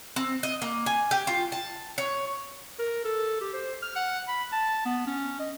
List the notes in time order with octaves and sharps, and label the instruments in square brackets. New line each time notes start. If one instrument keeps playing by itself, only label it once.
[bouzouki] C4
D#5
A#3
G#5
G4
F4
A5
C#5
[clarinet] A#4
A4
G4
C5
F6
F#5
B5
A5
B3
C#4
D#5